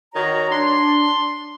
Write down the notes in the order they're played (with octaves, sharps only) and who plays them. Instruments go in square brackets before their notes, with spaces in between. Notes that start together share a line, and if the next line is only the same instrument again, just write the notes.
[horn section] D#3 [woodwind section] F#4 C#5 A#5
[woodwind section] D4 [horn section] C6